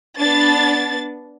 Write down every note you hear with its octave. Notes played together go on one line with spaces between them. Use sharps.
B3 D4 A6